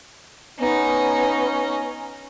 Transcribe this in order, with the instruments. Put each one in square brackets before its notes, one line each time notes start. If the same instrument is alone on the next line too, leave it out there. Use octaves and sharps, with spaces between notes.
[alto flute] B3 [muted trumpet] C#4 [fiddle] D#4